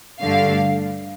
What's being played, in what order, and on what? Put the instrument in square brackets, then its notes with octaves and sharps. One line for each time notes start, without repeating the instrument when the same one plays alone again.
[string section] G2 D3 A3 F5